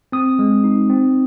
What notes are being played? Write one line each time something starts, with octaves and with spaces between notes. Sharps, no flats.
C4 D#6
G#3
D#4
C4